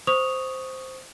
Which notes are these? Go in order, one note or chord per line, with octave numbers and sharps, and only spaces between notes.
C5 C#6 D#6 F7